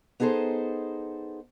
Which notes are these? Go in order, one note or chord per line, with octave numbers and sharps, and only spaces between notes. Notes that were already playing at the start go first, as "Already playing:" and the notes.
B3 D#4 G#4 A4 C5